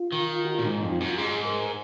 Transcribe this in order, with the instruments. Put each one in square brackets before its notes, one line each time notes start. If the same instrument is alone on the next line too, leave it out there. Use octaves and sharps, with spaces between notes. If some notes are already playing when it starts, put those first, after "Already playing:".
Already playing: [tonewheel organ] F4
[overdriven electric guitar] D#3
[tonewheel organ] F#4
[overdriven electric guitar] A#2 [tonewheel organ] F4
[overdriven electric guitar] G#2 [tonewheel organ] D#4
[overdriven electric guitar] F2
[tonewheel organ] F4
[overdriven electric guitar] F#2
[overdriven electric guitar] G#2 [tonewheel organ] G#4
[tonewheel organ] A#4